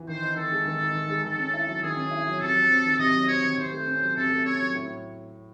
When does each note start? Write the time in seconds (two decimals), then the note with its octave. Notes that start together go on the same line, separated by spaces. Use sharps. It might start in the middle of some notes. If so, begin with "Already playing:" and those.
Already playing: E3
0.08 D#3 C5
0.22 D#4
0.36 D#3 A4
0.52 G#3
0.66 D#3
0.81 D#4
0.95 D#3
1.09 G#3
1.24 D#3 A4
1.39 C#4
1.54 E4
1.67 F#3
1.82 D#3 G#4
1.97 C#4
2.11 E4
2.26 F#3
2.40 C3 A4
2.55 F#3
2.70 C4
2.85 D#3
2.99 C3 D#5
3.14 F#3
3.28 C4 C#5
3.43 D#3
3.57 C3 C5
3.72 A3
3.87 C#4
4.02 F#3
4.15 C3 A4
4.30 A3
4.45 C#4 C#5
4.59 F#3
4.75 A2